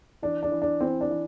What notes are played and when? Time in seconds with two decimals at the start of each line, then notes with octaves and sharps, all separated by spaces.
0.22 E3 D4
0.43 D4
0.52 E3
0.62 D4
0.81 E3 C4
1.01 D4
1.11 E3